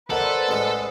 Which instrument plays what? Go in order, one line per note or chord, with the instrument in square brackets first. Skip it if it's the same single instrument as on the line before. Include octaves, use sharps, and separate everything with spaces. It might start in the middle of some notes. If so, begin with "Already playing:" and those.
[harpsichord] A#3 [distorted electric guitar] A4 [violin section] B4 C5 [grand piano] D5 F#5 F#7
[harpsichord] A1 G#3